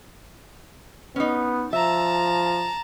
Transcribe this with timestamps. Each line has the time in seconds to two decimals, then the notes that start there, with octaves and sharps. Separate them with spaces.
1.16 B3 C#4 D#4
1.73 F3 E5 A5 A#5